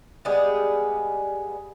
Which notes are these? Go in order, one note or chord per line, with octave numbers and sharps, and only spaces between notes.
G3 G#3 B3 G#4